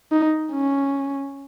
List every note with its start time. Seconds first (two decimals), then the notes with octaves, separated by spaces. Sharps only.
0.12 D#4
0.53 C#4